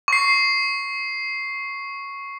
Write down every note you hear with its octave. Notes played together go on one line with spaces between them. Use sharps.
C#6 C7